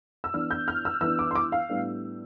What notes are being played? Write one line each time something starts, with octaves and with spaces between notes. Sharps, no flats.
E6
E3 B3 D4 F6
G6
F6
E6
E3 B3 D4 E6
D6
C6
D6
F5
A2 G3 B3 D4